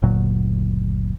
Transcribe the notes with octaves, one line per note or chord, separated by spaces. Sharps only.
F#1 D2 A#2 F#3